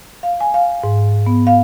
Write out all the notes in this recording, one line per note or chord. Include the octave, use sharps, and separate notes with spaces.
F5
G#5
F5
G#2
B3
F5